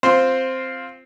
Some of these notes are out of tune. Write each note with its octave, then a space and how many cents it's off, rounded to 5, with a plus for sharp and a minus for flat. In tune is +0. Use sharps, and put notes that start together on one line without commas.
C4 +0 F4 +5 C5 +0